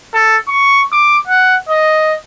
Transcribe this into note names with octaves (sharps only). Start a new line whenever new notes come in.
A4
C#6
D6
F#5
D#5